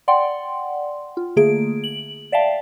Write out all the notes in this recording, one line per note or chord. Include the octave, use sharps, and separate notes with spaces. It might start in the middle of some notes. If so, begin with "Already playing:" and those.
D5 F#5 G5 C6
F4
D3 A3 A#3 G#4 D7
F#7
D5 E5 F5 G5 A5